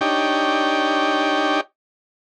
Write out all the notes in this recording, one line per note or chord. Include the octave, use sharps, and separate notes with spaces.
D4 D#4 G4 C#5 G5